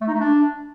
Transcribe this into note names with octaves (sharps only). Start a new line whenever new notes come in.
A3
D#4
A3
D4